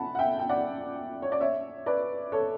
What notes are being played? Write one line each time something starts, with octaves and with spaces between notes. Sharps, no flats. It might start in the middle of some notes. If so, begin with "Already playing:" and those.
Already playing: F#5 A5 B5
F#5
E5 G5
G5
D5 F#5
C#5
D5
C#5 E5
B4 D5
A4 C#5